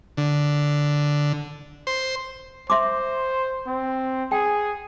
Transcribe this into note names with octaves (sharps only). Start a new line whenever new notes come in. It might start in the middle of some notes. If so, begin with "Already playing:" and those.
D3
C5
C5 E5 C6 D6
C4
G#4 G5